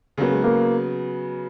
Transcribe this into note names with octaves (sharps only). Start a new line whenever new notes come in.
C#3 F#3 A#3 B3
G#3
A#3